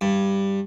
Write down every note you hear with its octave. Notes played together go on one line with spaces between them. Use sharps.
G2